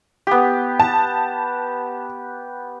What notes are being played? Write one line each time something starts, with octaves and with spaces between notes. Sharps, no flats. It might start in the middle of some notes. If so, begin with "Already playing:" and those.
B3 G4
A5